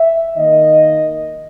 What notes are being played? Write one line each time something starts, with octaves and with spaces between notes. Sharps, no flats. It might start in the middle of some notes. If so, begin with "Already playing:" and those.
Already playing: E5
D#3 A#3 D#5